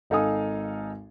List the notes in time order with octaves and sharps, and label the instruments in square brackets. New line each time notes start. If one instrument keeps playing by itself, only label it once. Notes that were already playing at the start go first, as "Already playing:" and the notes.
[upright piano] G#1 D#4 A4 F5 G#5 D#6